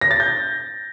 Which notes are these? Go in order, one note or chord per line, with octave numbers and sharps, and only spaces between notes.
A#6
A6
G6